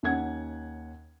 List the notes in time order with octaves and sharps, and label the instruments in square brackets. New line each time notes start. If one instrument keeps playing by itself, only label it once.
[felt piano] D#2 C#4 F#5 G#6